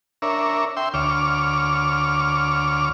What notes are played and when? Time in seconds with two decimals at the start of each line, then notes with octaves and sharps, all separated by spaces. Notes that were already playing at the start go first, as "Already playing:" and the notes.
0.22 D4 A#4 C#5 E5
0.77 E5 G5 C6
0.94 D2 C#5 D6 F6